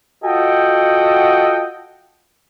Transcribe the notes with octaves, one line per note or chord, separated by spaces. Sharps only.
F4 F#4 A4 D#5 F#5 G5